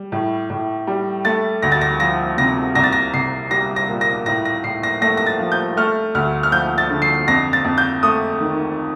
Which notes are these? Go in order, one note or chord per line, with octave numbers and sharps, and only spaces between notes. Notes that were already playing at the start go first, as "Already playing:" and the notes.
Already playing: G3
A2
A2
G3
A3 A6
D2 A#6
A6
A#6
F3 A#6
C3 A#6
C2 A#6
A6
A#6
C2 C7
G3 A#6
A#6
A#2
A#6
A2 A#6
A#6
A2 C7
A#6
A3 A#6
A#6
A6
F3
G6
A3 F6
D2 F6
F6
F3 G6
A6
D3
C7
F2 A#6
A6
F2
G6
A3 D#6
D#3